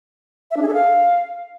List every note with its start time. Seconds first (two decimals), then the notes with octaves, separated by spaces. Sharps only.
0.51 E5
0.56 D4
0.62 G#4
0.68 A4
0.73 F5